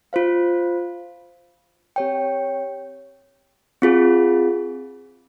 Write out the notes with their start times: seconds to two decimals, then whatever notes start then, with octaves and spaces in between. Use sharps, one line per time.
0.13 F4 C5 F5
1.96 C4 G4 C#5 G5
3.82 C4 F4 G#4